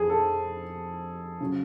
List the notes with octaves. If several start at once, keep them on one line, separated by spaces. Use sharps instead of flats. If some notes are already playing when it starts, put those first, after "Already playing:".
Already playing: F2 F3 G#4
A4
C#3 F#3